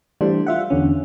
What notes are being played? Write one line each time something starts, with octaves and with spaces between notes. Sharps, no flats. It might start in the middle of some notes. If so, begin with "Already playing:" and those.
E3 G3 A3 D4 C5
F4 E5 F#5
E2 D3 C#4